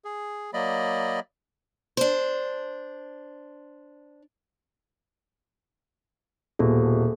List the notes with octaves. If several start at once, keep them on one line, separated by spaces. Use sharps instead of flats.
G#4
F#3 A#3 D5 D#5 B5
D4 C5
D#1 B2 A#3 G#4 A4